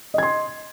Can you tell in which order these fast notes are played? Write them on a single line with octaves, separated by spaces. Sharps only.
D#5 G#6 C6